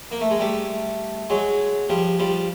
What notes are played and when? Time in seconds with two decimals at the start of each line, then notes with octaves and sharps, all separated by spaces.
0.11 A#3
0.21 A3
0.30 G#3
0.39 G3 A3
1.30 F#3 G#3
1.89 F3 G3
2.19 F3 G3